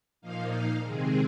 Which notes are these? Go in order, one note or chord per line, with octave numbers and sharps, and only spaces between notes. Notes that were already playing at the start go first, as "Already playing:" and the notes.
A#2 F3 A#3 D#4 F5
F5
C3 D#3 G#3 C4 G#4